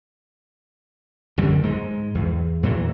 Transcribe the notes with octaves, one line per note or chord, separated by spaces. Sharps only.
G1 F#2 D3 G3
G#2 G#3
E2
E2 A#2 E3 F#3